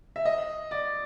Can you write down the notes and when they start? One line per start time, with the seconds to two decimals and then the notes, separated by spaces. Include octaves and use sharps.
0.16 E5
0.25 D#5
0.71 D5